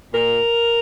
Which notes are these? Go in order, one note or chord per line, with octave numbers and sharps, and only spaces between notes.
A#2 A#4